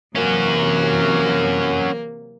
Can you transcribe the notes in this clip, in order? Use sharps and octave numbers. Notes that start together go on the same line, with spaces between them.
C3 E3 F#3 A#3 C#4 F#4